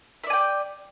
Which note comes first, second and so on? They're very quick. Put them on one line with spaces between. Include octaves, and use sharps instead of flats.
E5 D5 G#5 G5